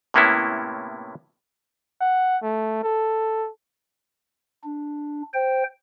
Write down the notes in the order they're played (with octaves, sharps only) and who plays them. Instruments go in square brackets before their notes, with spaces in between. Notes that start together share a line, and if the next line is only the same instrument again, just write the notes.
[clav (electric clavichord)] A2 C3 A#3 B3 C#4 E4
[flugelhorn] F#5
A3
A4
[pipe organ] D4
C5 G5